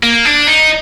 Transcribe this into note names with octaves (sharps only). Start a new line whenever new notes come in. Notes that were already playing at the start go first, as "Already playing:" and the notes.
A#3
D4
D#4